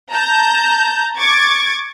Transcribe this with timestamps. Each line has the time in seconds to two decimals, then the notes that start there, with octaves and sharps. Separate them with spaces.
0.12 A5 A#5 G6
1.17 C#6 D6 G#6 A6